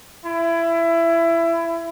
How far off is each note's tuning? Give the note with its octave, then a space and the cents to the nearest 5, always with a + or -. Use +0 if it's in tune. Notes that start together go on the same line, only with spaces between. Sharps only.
E4 +20